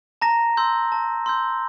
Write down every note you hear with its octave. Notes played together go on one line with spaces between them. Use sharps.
A5 A#5 A#6
C6 E6 G6
A5
C6 E6 G6